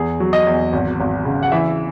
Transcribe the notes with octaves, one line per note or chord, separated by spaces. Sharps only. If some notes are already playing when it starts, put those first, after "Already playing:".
Already playing: E2 G#4
F#3
D#5
E2
G#1
G#1
C#3
F#5
E3 E5